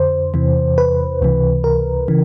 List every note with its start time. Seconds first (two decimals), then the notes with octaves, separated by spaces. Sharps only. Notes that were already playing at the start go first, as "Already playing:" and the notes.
Already playing: F2 D3 C5
0.34 E2 C3 E3
0.78 B4
1.21 C#2 C3 E3
1.64 A#4
2.08 C#3 E3